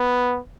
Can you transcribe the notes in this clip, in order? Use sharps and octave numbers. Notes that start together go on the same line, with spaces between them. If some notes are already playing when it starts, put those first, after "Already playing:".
Already playing: B3